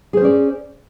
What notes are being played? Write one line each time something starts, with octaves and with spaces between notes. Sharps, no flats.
C#4 G#4 C5 D5